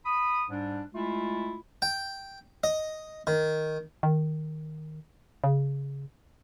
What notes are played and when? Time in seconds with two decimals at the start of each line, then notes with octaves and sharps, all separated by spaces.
0.05 B5 D#6
0.50 G#2 G3 D4
0.95 G#3 A3 E4 F4
1.82 G5
2.64 D#5
3.27 D#3
4.03 D#3
5.44 C#3